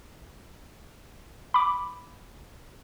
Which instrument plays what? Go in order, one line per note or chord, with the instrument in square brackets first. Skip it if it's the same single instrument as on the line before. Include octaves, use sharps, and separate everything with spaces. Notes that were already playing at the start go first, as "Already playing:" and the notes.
[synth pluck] B5 D6